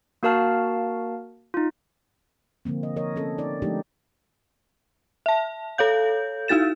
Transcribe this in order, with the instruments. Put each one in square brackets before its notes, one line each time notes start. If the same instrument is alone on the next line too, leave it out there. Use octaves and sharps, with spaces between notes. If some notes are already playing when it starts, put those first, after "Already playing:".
[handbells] A#3 F#4 A#4 F5 A5 F6
D#4 F4
[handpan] D3 F3 A#3 C4
D#5
F3 A#4 C#5 D#5
C4 C#4 A4
D#4 D5
F3 G#3 A3 D4 D#4 G4
[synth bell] E5 A5
A4 C#5 F5 G6
D#4 E4 F#4 A6 E7